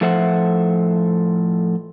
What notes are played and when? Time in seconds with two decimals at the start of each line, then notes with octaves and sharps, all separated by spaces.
0.01 A2 F3 A4 C5 E5 F#5